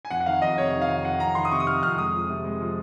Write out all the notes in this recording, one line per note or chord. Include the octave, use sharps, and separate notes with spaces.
G#5
F2 F#5
F#5
D#3 F5
F2 D#5
C3 C#5
D#3
F5
F2
F2 F#5
F2 A#5
D#3 C6
D#6
C3 C#6
D#6
F2 F6
F2 F6
G#3 D#6
F3
C3
G#3
F3